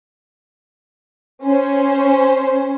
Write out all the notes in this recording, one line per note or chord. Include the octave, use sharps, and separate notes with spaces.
C#4 C5